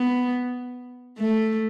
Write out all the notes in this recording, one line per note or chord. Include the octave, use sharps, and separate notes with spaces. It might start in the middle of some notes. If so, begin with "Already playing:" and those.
Already playing: B3
A3